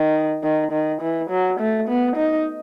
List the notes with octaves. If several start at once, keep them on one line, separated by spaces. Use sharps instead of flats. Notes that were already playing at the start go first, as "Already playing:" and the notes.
Already playing: D#3
D#3
D#3
E3
F#3
A3
B3
D#4